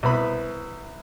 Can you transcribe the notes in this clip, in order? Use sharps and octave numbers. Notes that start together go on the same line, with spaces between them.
C2 B3 B5